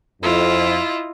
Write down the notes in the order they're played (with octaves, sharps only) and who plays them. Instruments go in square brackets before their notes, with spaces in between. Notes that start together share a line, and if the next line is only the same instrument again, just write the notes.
[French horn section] F2 [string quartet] E4 F4 D#5